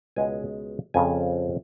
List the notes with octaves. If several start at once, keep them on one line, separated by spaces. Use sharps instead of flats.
C#2 B2 G#3 B3 G#5
F2 C#3 F3 G#5